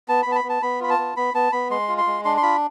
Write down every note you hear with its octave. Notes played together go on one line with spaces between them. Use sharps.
B3 A5
B3 B5
A5
B5
B3
A5
B3 B5
F4 B5
A5
B3
B3 B5
B3 A5
B3 B5
G#3 C6
F4
C6
G#3
D4 C6
C6
F4 B5